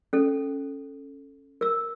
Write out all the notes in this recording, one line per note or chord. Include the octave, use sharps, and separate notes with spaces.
C#4 A4
A#4 E6